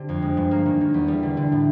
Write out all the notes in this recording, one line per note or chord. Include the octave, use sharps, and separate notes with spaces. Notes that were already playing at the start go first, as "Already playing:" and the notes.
Already playing: D3 C4 G4
F2
G#3
G2
A#3
D#3
D#3
E2
G3
D3
D3
A2